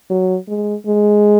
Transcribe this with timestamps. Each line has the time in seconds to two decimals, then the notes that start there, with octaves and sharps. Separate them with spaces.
0.10 F#3
0.48 G#3
0.87 G#3